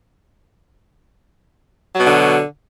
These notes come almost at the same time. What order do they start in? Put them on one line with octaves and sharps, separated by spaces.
F#3 B2 D3